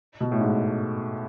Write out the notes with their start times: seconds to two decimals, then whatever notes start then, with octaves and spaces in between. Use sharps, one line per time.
0.21 B2
0.32 A2
0.40 G#2